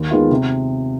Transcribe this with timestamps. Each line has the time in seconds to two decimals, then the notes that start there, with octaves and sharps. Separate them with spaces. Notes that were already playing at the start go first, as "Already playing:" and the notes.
Already playing: D#2
0.11 D#3 G#3 B3 F4
0.31 C3